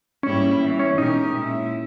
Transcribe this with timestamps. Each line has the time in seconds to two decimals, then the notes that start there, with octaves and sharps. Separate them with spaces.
0.23 G#2 G3 A#3 C#4 E4 G4
0.60 E3 G3 B3
0.79 C#4
0.98 B2 G#3 C#4 D#4 G4 A#4
1.35 A#2 G#3 C#4 E4